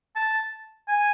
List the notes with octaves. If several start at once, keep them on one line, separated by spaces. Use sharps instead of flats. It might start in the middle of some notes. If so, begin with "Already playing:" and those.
A5
G#5